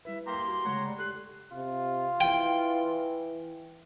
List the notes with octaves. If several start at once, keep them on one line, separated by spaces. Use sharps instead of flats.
G3 E4 B4 E5
A#3 G4 A#5 C6
F#4
C#3 G#3 A3 C#5 F#5 A#5
G3
G4 A4 C6 F#6
C3 F4
E3 G5